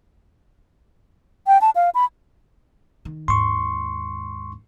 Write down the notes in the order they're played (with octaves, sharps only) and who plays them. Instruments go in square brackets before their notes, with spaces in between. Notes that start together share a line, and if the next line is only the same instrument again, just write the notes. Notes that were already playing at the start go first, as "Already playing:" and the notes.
[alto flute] G5
A5
F5
B5
[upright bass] D#3
[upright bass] D#2 G#2 [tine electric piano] C6 C#6